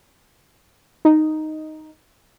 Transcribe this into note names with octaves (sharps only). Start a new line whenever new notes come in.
D#4